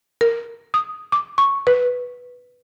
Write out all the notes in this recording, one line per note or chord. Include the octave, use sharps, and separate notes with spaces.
A#4
D#6
D6
C#6
B4